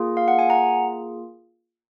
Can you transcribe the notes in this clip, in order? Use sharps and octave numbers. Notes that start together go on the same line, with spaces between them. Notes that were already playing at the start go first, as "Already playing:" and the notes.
Already playing: A#3 F4 G#4
F5
F#5
G#5
F#5 A#5